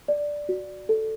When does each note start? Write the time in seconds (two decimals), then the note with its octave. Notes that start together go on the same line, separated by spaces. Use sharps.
0.08 D5
0.49 F#4
0.89 A4